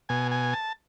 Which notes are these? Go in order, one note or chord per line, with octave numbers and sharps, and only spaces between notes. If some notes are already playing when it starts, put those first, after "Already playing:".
B2 G#5
G#5
A5